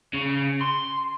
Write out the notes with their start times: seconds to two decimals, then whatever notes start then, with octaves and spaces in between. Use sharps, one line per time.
0.14 C#3
0.62 C6